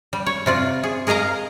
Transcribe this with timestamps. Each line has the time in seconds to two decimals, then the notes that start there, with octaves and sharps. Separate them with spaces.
0.13 G3
0.26 C#5
0.46 C3 F4 D5
0.83 G#4
1.07 G#4 A#4 D#5 F5 A#5